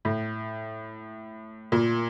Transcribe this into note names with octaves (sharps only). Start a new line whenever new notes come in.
A2
A#2